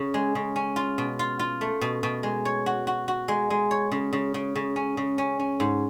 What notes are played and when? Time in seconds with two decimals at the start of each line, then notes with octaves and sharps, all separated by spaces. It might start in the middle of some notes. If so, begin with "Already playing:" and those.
Already playing: C#3
0.14 G#3
0.35 C#3
0.56 C#4
0.76 F4
0.98 B2
1.19 F4
1.39 F4
1.61 A3
1.81 B2
2.03 B2
2.23 G#3
2.45 C#5
2.66 F#4
2.87 F#4
3.08 F#4
3.28 G#3
3.50 G#3
3.71 C#5
3.91 C#3
4.13 C#3
4.34 C#3
4.55 C#3
4.76 C#4
4.97 C#3
5.18 C#4
5.39 C#4
5.60 G#2